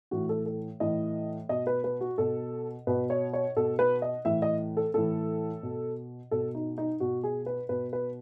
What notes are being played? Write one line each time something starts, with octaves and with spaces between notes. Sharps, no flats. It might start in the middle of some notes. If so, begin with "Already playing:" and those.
A2 E3 F#4
A4
A4
A2 E3 D#5
B2 D#5
B4
B4
F#4
B2 A4
B2 B4
C#5
C#5
B2 A4
B4
D#5
A2 E3 E5
D#5
A4
A2 E3 A4
B2
B2 A4
D#4
D#4
B2 F#4
G#4
B4
B2 B4
B4